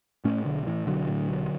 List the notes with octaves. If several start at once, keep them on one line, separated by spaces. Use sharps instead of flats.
A2 A3 C#4
B1 D3
A2 E3
B1 D3 F#3
A2
B1